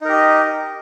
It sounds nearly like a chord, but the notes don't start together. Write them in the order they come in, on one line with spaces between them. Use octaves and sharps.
D#4 A#4 G4 D#5